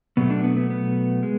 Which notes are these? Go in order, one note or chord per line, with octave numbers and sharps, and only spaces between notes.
B2 F#3 A3 B3
D4
B3
B3
B3
G#3